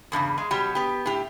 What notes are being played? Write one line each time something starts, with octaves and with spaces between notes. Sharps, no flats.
E2 G2 A#2 C#3
G#3
B2 F#3 G3 G4
B3 G4
A2 G4